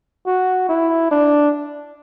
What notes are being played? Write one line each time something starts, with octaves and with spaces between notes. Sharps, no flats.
F#4
E4
D4